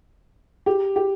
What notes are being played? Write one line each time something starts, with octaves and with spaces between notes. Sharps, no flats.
G4
G4